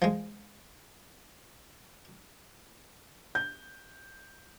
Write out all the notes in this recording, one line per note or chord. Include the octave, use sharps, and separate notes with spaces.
F3 G#3
G6